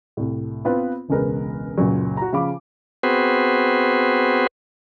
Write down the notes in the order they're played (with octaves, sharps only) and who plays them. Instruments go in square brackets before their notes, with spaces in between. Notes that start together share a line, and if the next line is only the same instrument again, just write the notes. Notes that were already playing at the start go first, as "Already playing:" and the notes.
[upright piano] C2 A2
B3 C4 F4 B4
E1 C#2 G#3 A#4 B4
C#2 F#2 A#2 F#3
F#4 A#5
C#3 F3 F5 B5 D6
[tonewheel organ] B3 C4 F#4 G#4 B4 C5